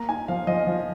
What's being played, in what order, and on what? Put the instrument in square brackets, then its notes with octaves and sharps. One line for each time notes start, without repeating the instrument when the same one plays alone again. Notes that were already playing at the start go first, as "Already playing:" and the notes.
Already playing: [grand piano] A#3 A#5
D#4 G#5
F3 F5
F3 D#5
F3